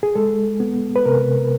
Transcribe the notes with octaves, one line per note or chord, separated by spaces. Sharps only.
G#4
G#3 A4
B3
B4
C3 A#4